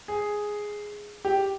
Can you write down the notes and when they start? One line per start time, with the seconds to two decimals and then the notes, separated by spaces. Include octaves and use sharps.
0.08 G#4
1.25 G4